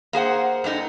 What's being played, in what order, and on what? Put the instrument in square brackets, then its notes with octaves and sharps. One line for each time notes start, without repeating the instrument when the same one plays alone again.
[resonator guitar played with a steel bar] A#3 G#4 C5 F#5
G2 D4 D#4 A4